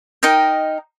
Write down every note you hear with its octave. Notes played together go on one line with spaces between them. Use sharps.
D#4 A#4 D#5 G5